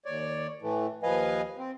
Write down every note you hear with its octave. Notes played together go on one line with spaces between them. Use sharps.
D#2 C#5 D5
A2 E3 A3
D#2 F3 B4 D#5 F5 G#5
C4